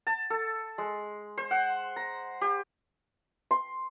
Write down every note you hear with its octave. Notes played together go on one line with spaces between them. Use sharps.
A5
A4
G#3
C5
F#5
A#5
G4
C6